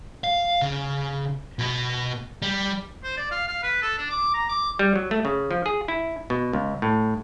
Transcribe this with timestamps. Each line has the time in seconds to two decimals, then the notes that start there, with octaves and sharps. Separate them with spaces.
0.24 F5
0.62 C#3
1.59 B2 B3
2.42 G3
3.04 C5
3.17 D5
3.31 F5
3.48 F5
3.63 B4
3.82 A4
3.98 D4
4.10 D6
4.34 A#5
4.49 D6
4.79 G3
4.96 F#3
5.11 A3
5.25 C#3
5.51 F3
5.66 G#4
5.88 E4
6.30 B2
6.53 C#2
6.82 A2